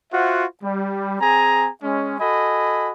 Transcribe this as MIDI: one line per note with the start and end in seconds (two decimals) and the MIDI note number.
0.13 0.45 65
0.13 0.45 66
0.13 0.45 72
0.13 0.45 76
0.13 0.45 78
0.63 1.17 55
1.20 1.70 60
1.20 1.70 68
1.20 1.70 80
1.20 1.70 82
1.83 2.15 56
1.83 2.15 61
2.20 2.93 66
2.20 2.93 69
2.20 2.93 75
2.20 2.93 80
2.20 2.93 83